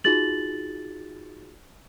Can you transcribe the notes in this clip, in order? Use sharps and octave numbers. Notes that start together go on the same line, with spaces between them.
D#4 F4 F#4 G#4 A6 F#7